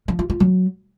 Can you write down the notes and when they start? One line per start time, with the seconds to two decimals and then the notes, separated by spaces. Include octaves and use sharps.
0.08 F3
0.19 F4
0.30 F4
0.40 F#3